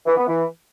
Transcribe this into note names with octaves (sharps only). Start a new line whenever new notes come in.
E3
B3
E3